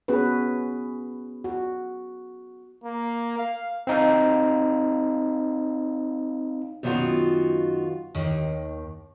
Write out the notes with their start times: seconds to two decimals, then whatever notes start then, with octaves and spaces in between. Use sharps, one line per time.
0.08 B3 C#4 F#4 G#4 B4
1.44 F#4
2.84 A#3
3.38 F5
3.87 C4 D#4 F5
6.83 F#2 D#3 B3 D4 F4 F#4
8.15 D#2 D#3